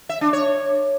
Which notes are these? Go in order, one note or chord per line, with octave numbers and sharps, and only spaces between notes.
E5
D4
C#5